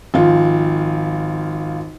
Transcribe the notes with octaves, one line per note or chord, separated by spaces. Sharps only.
G#1 F3 F4